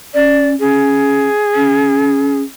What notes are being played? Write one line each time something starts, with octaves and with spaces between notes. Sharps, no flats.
C#4 D5
C#4 G#4
C#4